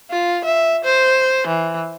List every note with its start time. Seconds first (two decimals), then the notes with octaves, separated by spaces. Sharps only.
0.10 F4
0.44 E5
0.84 C5
1.47 E3